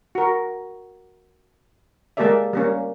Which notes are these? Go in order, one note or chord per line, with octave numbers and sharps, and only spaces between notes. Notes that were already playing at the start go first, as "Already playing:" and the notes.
F#4 A#4
G#3 A#3 G4 A4 D5 E5
G3 A#3 C#4